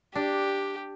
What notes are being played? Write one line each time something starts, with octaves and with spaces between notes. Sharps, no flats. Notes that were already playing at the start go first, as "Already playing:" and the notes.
D4 G4